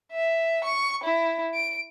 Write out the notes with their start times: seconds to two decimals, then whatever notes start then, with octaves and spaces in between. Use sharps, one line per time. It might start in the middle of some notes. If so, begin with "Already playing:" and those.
0.12 E5
0.64 C#6
1.04 E4
1.54 D7